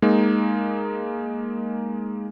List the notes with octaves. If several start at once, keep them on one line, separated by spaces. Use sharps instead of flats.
G#3 A#3 D#4